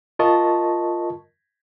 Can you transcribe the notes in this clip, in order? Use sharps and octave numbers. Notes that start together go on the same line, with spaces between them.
F4 A#4 D#5 A5 C#6